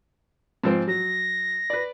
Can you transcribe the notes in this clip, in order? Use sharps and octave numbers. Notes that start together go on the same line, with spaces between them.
G#2 F3 C4
F#3 A#6
B4 D5